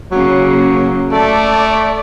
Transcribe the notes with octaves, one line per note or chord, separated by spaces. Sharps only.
C#3 F#3 A#3
A3 A4 D5